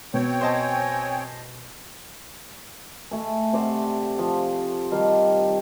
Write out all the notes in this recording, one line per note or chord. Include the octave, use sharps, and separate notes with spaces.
B2 C4 C#5 G5
C5 D#5 G#5 A5
A3 G#5
C3 C5 D5 F#5
F3
D#3 G3 F5 A5